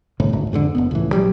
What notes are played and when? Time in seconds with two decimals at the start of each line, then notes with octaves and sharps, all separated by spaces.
0.20 G1 C2 A2 C3
0.33 G#1 D2
0.52 F2 G#2 B2 D3
0.75 F#1 E2 B3
0.91 C#2 A2 E3
1.13 A#1 F#3 G3